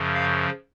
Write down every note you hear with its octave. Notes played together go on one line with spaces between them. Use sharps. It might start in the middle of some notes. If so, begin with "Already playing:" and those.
Already playing: F#2 C#3 F3
F5